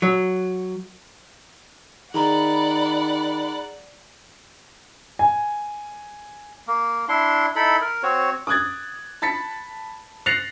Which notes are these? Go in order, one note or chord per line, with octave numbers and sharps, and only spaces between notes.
F#3
D#3 G#4 D5 F#5 A#5 B5 F#6
G#5
A#3
D4 E4 C6
D#4 E4 A4 B5
A#4
C4 F#4 C#5
D6 D#6 F#6 G#6 A6
A5 B5 A6 B6 C#7
F#6 A6 A#6 C7 C#7 F7